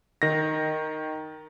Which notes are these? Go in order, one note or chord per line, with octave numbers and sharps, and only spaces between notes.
D#3 A#6